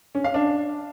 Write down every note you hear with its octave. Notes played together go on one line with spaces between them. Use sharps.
C#4
F5
D4